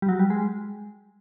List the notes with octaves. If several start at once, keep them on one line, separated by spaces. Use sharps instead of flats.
G3
F#3
G3
G#3